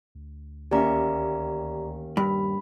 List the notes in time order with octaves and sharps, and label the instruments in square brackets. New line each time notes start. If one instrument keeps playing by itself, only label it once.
[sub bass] D2
[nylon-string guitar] D#2 C#4 E5 [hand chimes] G4 D5 A#5
[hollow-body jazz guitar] G2 [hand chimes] B5